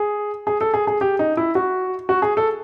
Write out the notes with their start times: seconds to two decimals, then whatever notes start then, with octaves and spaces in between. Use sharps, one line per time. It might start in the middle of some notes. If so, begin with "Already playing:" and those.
Already playing: G#4
0.47 G#4
0.61 A4
0.74 G#4
0.87 G#4
1.01 G4
1.19 D#4
1.37 E4
1.55 F#4
2.09 F#4
2.22 G#4
2.37 A4